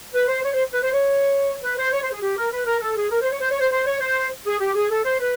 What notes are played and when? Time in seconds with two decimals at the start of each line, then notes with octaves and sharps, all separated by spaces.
0.13 B4
0.28 C5
0.43 C#5
0.53 C5
0.72 B4
0.83 C5
0.93 C#5
1.63 B4
1.78 C5
1.92 C#5
2.02 C5
2.12 G#4
2.22 G4
2.37 A#4
2.52 B4
2.66 A#4
2.81 A4
2.96 G#4
3.11 A#4
3.21 C5
3.31 C#5
3.41 C5
3.51 C#5
3.61 C5
3.71 C5
3.86 C#5
4.01 C5
4.46 G#4
4.60 G4
4.75 G#4
4.90 A4
5.05 C5
5.20 B4